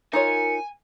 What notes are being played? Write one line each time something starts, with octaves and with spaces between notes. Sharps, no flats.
D#4 F4 A#4 C#5 G#5 C#7